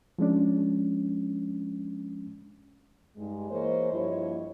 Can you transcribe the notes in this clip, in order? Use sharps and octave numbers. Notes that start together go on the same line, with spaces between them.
F3 G#3 C#4 D4
G2 G#3 D#4
E3 A#3 G#4 C5 C#5 D#5
G2 F3 A#3 E4 C#5 D#5